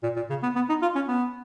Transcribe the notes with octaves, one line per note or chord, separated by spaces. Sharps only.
A#2
A#2
C#3
B3
B3
D#4
F4
C#4
B3